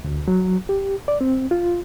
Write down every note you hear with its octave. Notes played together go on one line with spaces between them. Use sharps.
D2
F#3
G4
D5
C4
F4